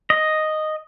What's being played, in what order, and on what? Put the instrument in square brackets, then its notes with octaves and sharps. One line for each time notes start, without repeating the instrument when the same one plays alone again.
[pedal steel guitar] D#5